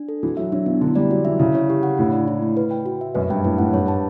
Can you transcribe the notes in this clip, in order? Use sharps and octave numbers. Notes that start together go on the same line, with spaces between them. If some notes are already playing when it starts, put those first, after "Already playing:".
Already playing: D4
A4
E3 F#4
F#3 E5
F#3 D4
E3 B3
D3 E4
G3 D5
F#3 F#4
E3 E5
C#3 E4
C#5
G4
F#5
A2 D4
D5
E4
A3
B4
G5
F#4
E5
F#2 B4
G2 G5
A2 B4
A2 F#5
G2 C#5
A5